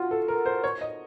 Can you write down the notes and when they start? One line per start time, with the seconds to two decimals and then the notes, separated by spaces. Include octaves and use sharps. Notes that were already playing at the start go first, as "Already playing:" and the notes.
Already playing: F4 F#4
0.11 A4
0.28 A#4
0.45 C5
0.64 C#5
0.81 D#5